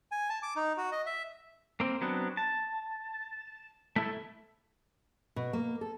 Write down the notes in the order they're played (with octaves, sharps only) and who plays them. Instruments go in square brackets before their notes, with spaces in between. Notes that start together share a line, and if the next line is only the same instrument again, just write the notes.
[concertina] G#5
A5
D6
D#4
F#4
D#5
E5
[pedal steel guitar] A#3 C4
F#3 B3 C4 D4
A5
A3 E4 A4
[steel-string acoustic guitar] B2
A#3
A4